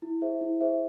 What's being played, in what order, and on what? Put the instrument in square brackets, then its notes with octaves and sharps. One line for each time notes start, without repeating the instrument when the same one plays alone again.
[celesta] E4
G#4 C5 E5
E4
G#4 C5 E5